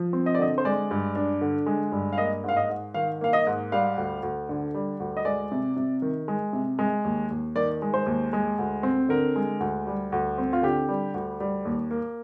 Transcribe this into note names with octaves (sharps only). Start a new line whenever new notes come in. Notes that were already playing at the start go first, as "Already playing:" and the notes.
Already playing: F3
C4
D#5
D5
D3 D#5
C5
G#3 D5
G2
D4
D3
G#3
G2
F5
A#3 D#5
G#2 F5
D#5
G#2
D#3 F5
A#3 F5
D#5
G#2
G3 F5
D2
D2
D3
G3
D2
D#5
G#3 D5
C3
C3
D#3
G#3
C3
G#3
D#2
D#2
D#3 D5
G#3
C5
D#2
G#3
D2
C4
D3 A#4
G#3
D2
G3
D2
C4
F4
D3 G4
G3
D2
G3
D#2
A#3